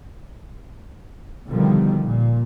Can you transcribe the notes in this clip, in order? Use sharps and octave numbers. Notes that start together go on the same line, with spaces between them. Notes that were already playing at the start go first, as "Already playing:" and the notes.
B2 D3 D#3 F3 G3
A#2